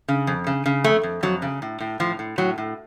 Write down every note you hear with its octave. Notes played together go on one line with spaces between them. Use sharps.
C#3
F2
C#3
C#3
F2 A3
F2
F2 F#3
C#3
A2
A2
A2 F3
A2
A2 F#3
A2